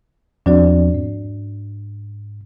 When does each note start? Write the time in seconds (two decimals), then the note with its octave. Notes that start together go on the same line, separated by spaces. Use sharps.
0.46 E2 F3 C4 D4 F#4 D5
0.94 G#2